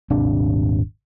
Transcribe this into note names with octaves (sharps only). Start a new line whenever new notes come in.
D#1 G#1 C3 D4